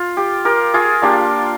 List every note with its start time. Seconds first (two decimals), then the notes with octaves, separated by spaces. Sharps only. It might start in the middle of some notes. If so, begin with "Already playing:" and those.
Already playing: F4
0.17 G4
0.45 G4 A#4
0.74 F4 G#4
1.02 A#3 D4 F4 G4